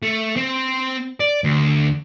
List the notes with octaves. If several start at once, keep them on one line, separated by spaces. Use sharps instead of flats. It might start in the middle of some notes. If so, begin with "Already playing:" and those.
A3
C4
D5
D2